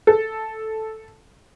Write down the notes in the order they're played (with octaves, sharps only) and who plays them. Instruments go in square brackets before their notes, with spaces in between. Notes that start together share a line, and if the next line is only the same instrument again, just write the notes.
[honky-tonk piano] A4